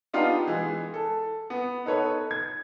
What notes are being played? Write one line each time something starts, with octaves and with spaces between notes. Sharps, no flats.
B3 D4 D#4 F4 G4
E3 G#3
A4
B3
D#4 A4 B4 C#5
G#6